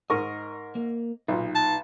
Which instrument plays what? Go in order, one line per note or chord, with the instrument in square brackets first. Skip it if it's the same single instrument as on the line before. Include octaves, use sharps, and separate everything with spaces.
[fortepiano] G#2 A#4 C#6 [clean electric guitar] D#5
[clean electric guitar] A#3
[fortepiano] B1 A#2 [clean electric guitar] D#4
[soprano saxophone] A5